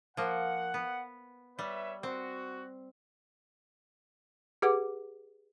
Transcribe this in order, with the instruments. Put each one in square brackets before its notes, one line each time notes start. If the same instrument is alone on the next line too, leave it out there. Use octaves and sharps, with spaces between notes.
[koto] F3 A#3 [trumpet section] F#5
[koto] B3
[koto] G3 [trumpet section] B4 C#5 E5
[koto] C4 [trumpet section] F#4
[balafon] G4 G#4 B4 F#5 D6